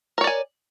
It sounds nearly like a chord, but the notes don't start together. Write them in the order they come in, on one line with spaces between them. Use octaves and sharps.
A#4 C#5 D5 G#5